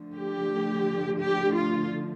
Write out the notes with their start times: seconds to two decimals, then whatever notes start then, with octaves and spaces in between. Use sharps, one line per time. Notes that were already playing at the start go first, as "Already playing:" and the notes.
Already playing: D3 F3 A3
0.14 G4
1.20 G4
1.55 F4